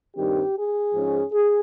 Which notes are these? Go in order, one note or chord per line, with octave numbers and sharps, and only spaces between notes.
G2 D#3 G3 C4 G4
G#4
G#2 F3 G#3 C#4
G#4